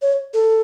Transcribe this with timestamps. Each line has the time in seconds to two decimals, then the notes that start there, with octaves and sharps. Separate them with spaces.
0.02 C#5
0.34 A4